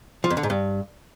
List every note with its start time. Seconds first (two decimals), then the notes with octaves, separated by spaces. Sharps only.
0.24 F3
0.30 F2
0.37 D3
0.43 G#2
0.50 G2